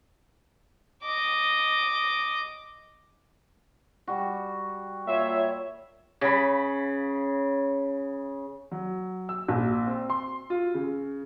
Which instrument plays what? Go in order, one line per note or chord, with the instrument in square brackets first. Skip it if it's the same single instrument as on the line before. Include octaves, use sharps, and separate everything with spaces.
[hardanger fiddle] D#5 D6
[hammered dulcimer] G3 F#4
[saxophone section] A#2 F4 E5 [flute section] C#5
[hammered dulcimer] C#3 B5
[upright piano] F#3
E6
A#1
C4
C6
F4
C#3